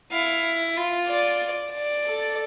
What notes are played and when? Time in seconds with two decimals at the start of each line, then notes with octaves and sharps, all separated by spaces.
0.12 E4 F5
0.77 F4
1.08 D5
1.73 D5
2.05 A4